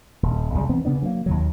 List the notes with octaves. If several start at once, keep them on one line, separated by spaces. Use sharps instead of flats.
D#1
B1 C#3 G3
E3 B3 C4
C#3 B3 D4
F#3 A#3
D#2 D#3 F#3